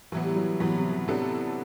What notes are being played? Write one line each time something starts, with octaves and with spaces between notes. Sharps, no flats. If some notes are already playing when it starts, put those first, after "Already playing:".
A2 E3 F#3 B3
G3
F#3
A2 E3 F#3 B3
C3
E3
A2 C3 F#3 B3 D4 A4